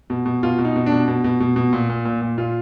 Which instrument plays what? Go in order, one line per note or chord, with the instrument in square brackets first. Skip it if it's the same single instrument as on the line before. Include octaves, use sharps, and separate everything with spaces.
[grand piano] B2
B2
B2 F4
B2
D#4
B2
D4
B2
B2
B2
B2
B2
A#2
A#2
A#2
A#2
A#2 F4